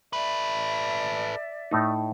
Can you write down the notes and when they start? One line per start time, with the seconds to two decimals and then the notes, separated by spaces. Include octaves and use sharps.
0.13 A4 B4 D5 E5
1.71 A2 A3 D#4